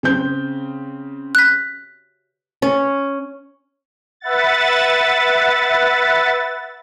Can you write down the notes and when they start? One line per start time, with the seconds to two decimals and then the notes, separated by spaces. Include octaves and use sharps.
0.03 C#3 C4 G6
1.35 F#6 B6
2.62 C#4
4.20 B4 E5 F#5 A6